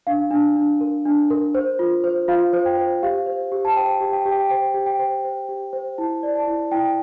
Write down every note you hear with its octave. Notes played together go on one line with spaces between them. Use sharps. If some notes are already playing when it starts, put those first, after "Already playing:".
D4 F5
D4
D4
A#4
D4
A#4
C5
F4
C5
F4 F5
C5
G5
C5
G4 F5
C5
G4
A5
C5 G5
G4
G5
G4
G5
C5 G5
G4
G5
C5
C5
G4
C5
E4 A5
D5
A5
E4
E4 G5